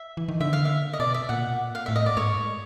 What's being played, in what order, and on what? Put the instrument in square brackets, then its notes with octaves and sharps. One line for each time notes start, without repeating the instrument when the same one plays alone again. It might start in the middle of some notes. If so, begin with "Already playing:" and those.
Already playing: [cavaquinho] E5
[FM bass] E3
D#3
[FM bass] D3 [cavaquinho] E5
[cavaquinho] F5
E5
D#5
[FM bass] B2 [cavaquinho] D5
[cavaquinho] E5
[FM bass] A#2 [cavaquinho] F#5
[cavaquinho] F5
[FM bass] A2 [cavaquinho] E5
[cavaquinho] D#5
D5
[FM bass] G#2 [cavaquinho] C#5